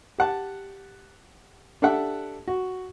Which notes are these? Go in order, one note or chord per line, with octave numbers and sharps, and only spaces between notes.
G4 F#5 A5
D4 G4 A4 E5 F#5
F#4